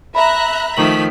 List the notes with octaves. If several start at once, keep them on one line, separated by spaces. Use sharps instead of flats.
E5 A#5 B5 F#6
D#3 F3 A3 C#6 B6 F#7